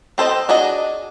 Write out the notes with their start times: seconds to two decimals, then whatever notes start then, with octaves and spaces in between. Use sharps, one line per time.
0.18 C4 A4 C5 D#5
0.49 D4 F#4 G#4 D#5